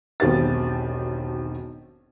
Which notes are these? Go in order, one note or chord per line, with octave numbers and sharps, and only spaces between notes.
E1 B1 D#3 C4 G4 A6